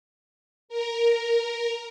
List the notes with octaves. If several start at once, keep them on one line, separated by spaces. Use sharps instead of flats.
A#4